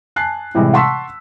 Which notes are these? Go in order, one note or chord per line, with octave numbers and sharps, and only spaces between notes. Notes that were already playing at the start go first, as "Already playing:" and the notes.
G#5 A5 F#6 C7
A2 C3 E3 G3 G#3
F#5 A5 C6 C#6 E6 B6